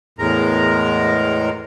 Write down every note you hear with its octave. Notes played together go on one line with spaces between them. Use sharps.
E2 A2 G#3 A#4 A#5